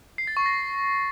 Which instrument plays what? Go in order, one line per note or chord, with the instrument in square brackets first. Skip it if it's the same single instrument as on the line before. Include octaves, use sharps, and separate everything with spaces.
[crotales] C7
A6
C#6
A#6